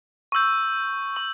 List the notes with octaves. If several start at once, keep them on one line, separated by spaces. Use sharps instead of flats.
C#6 E6 G6
C#6 F#7